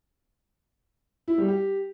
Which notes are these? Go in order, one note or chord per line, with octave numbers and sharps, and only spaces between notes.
E4
G3
G4